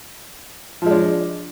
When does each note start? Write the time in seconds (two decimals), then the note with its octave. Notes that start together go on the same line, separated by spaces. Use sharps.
0.82 F3
0.86 G#3
0.91 D4